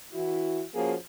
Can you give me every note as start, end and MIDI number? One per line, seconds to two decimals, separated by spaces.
0.13 0.63 52
0.13 0.63 64
0.13 0.63 66
0.75 0.94 53
0.75 0.94 58
0.75 0.94 61
0.75 0.94 66
0.75 0.94 68